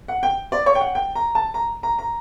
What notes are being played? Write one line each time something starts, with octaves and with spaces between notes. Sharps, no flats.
F#5
G5
D5
C#5
G5
F#5
G5
A#5
A5
A#5
A#5
A#5